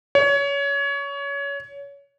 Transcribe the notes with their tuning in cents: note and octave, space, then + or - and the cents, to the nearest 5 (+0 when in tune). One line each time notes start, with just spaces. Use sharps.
C#5 +25